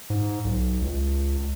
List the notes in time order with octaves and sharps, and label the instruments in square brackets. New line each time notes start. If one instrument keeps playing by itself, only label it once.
[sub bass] G#2
B1
C#2